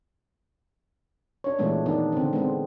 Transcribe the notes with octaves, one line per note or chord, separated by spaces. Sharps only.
D4 C#5
A#2 E3 G#3 A3 B3 D4
D#3 B3 D4 D#4
D3 C4
G#3 B3 C4